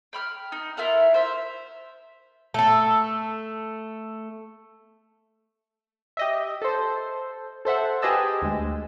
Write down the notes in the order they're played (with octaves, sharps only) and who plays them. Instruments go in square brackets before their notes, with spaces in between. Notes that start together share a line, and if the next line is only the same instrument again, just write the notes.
[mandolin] G5 B5 F6
D#4
E4 F4 A#4 F#5
C5 E5
[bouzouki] A3 A4
[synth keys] G4 D#5 E5
A4 C5
A4 C5 E5 F#5
G4 G#4 B4 D#5 A5 E6
D2 G#3